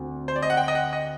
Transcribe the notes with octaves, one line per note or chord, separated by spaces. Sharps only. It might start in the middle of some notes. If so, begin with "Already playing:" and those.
Already playing: D2 C4
C5
D5
D#5
F#5
G5
D#5
F#5
D#5